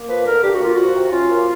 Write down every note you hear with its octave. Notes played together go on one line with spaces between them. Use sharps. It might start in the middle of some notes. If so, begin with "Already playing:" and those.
Already playing: A#3
F3 B4
D3 A#4
D3 G4
F#4
A#3 F4
F3 F#4
C3
C#4 F4
A#3